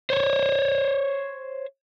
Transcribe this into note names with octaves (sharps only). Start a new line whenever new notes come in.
C5 C#5